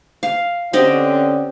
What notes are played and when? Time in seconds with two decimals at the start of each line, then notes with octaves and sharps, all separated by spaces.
0.23 F5
0.73 D3 C4 C#4 G4 D#5